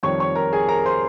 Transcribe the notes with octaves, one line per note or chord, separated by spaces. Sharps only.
F2 D#3 G3 C#5 C#6
C#5 C#6
A#4 A#5
G#4 G#5
A#4 A#5
C5 C6